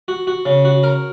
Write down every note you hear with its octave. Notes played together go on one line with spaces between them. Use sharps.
F#4
F#4
C#3
F#4
A#4